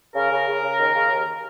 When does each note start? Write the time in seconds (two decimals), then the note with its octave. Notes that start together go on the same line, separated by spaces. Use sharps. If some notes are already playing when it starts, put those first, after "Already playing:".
0.15 C#3 A#4
0.31 C#3
0.47 C#3
0.63 C#3
0.78 D#2
0.94 C#3
1.11 D#2